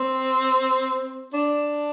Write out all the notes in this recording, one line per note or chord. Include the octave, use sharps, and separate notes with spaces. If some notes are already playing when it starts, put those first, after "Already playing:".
Already playing: C4
D4